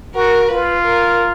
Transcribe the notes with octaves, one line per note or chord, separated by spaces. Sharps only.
F#4 A#4
F4 B4
A#4